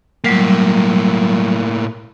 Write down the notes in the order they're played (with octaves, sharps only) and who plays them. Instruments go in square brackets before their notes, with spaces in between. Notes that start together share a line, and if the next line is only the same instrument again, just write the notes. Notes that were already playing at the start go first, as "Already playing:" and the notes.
[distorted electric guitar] A2 A#3 [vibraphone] F#3 G3